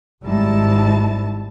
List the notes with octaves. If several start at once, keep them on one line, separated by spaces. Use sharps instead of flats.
G#1 G#2 G3 E4 A5